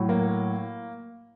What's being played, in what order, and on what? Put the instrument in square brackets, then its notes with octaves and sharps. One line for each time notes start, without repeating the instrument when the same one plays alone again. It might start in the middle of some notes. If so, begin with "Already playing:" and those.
Already playing: [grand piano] A2 F#3
A#3